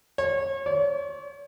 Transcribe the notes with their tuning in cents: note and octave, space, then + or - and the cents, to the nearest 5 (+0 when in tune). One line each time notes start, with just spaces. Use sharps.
C#5 -35
C#5 +45